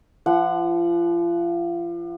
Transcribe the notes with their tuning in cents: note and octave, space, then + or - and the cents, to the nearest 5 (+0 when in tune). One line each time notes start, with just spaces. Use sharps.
F3 -35 F#5 +0